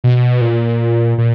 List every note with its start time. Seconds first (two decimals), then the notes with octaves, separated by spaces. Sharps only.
0.04 B2
0.41 A#2
1.18 A#2